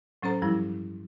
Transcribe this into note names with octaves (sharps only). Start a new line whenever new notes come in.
A2 F#3 C#4 A4 C5 A#5
G2 F3 G3 E4